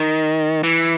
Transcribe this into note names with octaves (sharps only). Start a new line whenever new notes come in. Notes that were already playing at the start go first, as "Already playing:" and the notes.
Already playing: D#3
E3